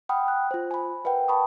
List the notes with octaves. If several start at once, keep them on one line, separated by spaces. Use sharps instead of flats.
F#5 G5 B5 D#6 F6
F#6
F4 C5
G#5 B5
A#4 B4 E5 F#5 G5
A5 B5 C#6 D#6